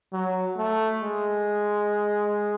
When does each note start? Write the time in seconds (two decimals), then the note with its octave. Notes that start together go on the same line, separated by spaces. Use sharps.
0.13 F#3
0.57 A3
1.02 G#3